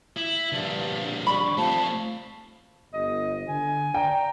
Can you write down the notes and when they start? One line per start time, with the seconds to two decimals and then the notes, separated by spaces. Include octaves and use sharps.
0.16 E4
0.52 G2 D3 F3
1.27 G3 B5 C#6
1.57 F3 A3 C4 A5
2.93 G1 D#5
3.48 D3 G#5
3.94 D5 G5 A#5